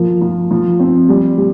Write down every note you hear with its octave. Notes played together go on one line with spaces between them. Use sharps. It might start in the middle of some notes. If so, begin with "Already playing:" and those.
Already playing: F3 A#3
F3
F3
C4
G3
G3